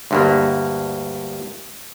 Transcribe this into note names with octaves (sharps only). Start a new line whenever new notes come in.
D2 G2 A#3